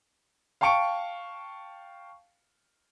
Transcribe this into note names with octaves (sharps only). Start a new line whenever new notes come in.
F5 G5 A5 C#6 C#7 D7